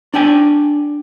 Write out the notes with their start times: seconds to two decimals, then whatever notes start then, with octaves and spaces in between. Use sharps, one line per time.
0.14 D4 D5 G5 G#5